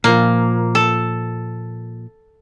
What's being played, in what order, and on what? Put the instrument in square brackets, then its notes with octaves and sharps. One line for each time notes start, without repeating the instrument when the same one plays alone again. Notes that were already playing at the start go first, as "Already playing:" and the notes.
[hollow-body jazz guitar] A#2 F3 [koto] A#3
[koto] A4